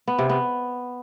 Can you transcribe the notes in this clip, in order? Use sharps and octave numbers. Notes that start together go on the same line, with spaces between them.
B3
C3
B3